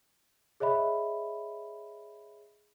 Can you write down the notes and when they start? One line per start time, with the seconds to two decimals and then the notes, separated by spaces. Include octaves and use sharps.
0.60 G#4 C#5 D#5 E5 B5